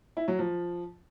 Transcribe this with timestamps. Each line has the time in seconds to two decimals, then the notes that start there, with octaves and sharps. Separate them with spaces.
0.17 E4
0.28 F#3
0.39 F3